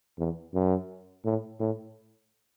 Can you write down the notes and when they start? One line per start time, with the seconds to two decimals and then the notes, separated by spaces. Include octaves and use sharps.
0.18 E2
0.54 F#2
1.25 A2
1.60 A2